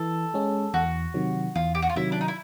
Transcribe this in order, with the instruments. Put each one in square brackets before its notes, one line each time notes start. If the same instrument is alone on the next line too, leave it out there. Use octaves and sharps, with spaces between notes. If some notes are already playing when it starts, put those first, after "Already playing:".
Already playing: [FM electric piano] E3 [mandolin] A4
[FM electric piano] G#3 C#4
[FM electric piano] E2 [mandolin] F#4
[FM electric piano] C3 D#3 F#3
[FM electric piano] E2 [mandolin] F4
[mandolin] G4
F#4
F4
[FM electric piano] C3 D#3 F#3 [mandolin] E4
[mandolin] D4
D#4
E4